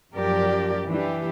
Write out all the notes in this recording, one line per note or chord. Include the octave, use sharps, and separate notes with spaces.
F#2 F3 G4 A#4 D5
E3 D4 G4